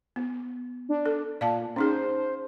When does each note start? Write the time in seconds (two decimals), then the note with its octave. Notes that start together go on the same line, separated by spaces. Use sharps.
0.16 B3
0.89 D4
1.06 A4
1.41 A#2 D5 F5 A5
1.76 C#4 D#4 G#4 C5